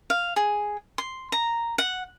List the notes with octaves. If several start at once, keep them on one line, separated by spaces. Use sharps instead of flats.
F5
G#4
C6
A#5
F#5